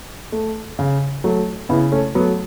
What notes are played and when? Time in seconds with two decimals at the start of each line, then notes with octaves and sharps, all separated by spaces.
0.32 A3
0.79 C#3
1.24 F#3 A3
1.69 C#3 B3 E4
1.92 A3 C#4
2.15 F#3 A3 B3